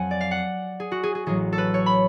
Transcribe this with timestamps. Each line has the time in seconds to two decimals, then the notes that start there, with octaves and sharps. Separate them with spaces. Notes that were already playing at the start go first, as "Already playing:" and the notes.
Already playing: F2 F#3 F#5 G#5
0.11 D5
0.21 F5
0.31 F#5
0.80 G#4
0.92 F#4
1.03 G#4
1.15 G#4
1.26 A1 A2 F#3 G#4
1.52 A4
1.58 B4
1.74 C#5
1.86 B5